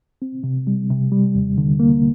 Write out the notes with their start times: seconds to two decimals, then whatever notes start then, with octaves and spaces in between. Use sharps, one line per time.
0.22 C4
0.44 C3
0.67 G3
0.90 C3
1.12 G3
1.35 D#2
1.58 D3
1.80 A#3